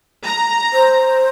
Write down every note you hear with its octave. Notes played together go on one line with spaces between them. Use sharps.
A#5
C5